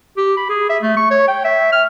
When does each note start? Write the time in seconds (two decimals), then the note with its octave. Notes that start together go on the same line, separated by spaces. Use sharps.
0.17 G4
0.37 B5
0.49 G#4
0.69 E5
0.83 A3
0.97 C#6
1.11 C#5
1.28 G5
1.45 E5
1.72 F6